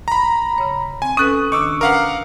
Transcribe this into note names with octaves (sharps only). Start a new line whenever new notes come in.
A#5 B5
C#3 C#5
C4 G#5
C#4 A4 B4 D#6 F#6
D#3 D4 C#6 D6 E6
C#4 A#4 B4 F5 F#5